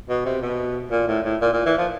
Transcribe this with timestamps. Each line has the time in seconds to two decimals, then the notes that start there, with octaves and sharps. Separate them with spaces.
0.09 B2
0.26 C3
0.42 B2
0.91 A#2
1.08 A2
1.25 A2
1.41 A#2
1.53 A#2
1.66 E3
1.78 F3